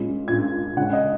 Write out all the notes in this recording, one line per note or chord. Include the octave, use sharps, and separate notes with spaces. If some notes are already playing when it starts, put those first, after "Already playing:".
Already playing: A#2 G#3 C#4
A#2 G#3 C#4 G#6
C#3 G#3 C#4 F#5
D#5